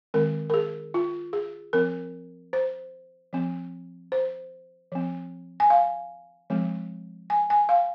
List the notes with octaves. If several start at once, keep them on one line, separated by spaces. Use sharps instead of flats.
D#3 G#3 C4 A#4
A#4
G#4
F4
G#4
F3 C4 A#4
C5
F3 C4
C5
F3 C4
G#5
F5
F3 G#3 C4
G#5
G#5
F5